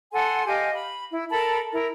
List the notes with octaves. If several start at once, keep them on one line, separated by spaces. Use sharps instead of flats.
A4 F#5 G#5 C6
G4 D#5 F5 G#5
B5
E4
A4 A#4 A5 B5
E4 A#4